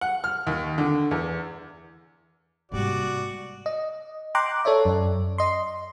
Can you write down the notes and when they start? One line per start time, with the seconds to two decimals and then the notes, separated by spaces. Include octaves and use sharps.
0.01 F#5
0.24 F6
0.47 D#2
0.78 D3
1.11 E2
2.72 G#2 C3 G3 A#3 F#4 D5
3.66 D#5
4.35 G5 A#5 C6 D6 F#6
4.65 A4 C#5 D5 E5
4.85 F#2
5.38 D#5 C6